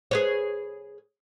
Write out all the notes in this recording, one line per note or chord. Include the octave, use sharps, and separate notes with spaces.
G#4 B4 C#5